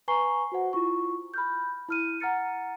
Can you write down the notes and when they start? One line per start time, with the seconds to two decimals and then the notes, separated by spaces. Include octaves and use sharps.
0.08 B4 G#5 A#5 C#6 C7 G7
0.52 F#4 C5 F#5
0.73 E4 F4 C#6
1.34 B5 F6 G6
1.89 E4 F6 D#7
2.20 F#5 A#5 F6 A6 C#7